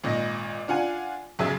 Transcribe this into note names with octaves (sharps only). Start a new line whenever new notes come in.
G#1 A#2 D#5 A#6
D4 F4 F#5 G#5
B1 F#2 C#3 G#4 E5